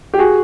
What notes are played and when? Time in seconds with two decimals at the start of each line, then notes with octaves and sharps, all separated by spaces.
0.14 G4
0.18 F#4 G#4